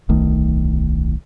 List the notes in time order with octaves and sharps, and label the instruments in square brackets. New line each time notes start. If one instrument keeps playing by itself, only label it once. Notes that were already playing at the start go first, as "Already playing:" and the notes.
[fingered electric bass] D1 B1 D#3 A3